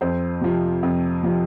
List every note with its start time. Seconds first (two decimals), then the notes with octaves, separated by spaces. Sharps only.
0.01 F2 C5
0.41 C3 F3
0.83 F2
1.23 C3 F3